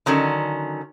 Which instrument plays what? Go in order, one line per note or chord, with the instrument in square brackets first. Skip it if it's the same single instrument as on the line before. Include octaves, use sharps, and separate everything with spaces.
[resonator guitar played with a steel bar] D3 D#3 F#3 C#4